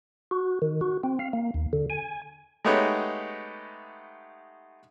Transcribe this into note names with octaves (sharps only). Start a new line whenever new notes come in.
F#4
D#3
F#4
C4
F5
A#3
D#2
D3
G#5
G#3 A3 B3 D#4 G4 C#5